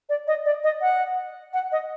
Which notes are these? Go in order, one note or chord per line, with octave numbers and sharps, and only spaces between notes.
D5
D#5
D5
D#5
F#5
F#5
D#5